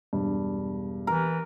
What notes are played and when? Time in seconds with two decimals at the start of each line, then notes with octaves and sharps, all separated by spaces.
0.13 E1 G2
1.07 E3 A#4